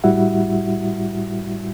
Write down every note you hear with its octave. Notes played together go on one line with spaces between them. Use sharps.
A2 G3 E4 F#4 E5 F#5